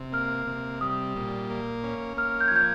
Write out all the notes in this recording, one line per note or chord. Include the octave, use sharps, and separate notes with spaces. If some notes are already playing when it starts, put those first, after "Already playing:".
Already playing: C3
A#3 F6
C3
G3 D#6
A#2
A#3
C#4
A#3 F6
G6
G#6
F3 G6